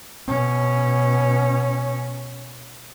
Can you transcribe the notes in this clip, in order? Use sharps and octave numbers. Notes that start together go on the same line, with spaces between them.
B2 C#4